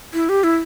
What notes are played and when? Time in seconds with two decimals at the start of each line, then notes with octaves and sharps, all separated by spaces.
0.14 E4
0.29 G4
0.44 E4